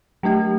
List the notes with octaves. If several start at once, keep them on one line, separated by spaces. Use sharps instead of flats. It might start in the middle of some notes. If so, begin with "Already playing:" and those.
F#3 A3 D4 G4